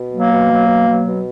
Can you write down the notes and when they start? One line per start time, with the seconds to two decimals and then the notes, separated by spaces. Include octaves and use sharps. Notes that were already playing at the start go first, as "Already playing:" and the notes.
Already playing: B2
0.12 F#3 A#3
0.32 B2
0.51 F#3
0.68 B2
0.88 F#3
1.07 B2